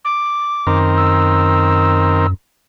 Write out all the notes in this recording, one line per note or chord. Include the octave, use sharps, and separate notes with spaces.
D6
F#2 D#3 C4 A#4
E6